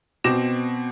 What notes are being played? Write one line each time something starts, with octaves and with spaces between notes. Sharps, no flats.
B2 C4 D6 A#6 E7